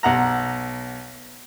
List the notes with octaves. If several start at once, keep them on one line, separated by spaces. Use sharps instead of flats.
B1 F#5 A#5